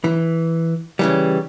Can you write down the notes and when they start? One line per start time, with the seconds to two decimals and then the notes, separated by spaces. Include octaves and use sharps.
0.04 E3
0.99 C#3 E3 G3